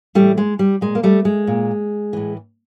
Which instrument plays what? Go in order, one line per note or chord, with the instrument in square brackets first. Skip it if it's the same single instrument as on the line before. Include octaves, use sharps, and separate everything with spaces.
[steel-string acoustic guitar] A2 E3 G3 A3
G#3
G3
A#2 G#3
A#3
G3 A3
G#3
A#2
A2 E3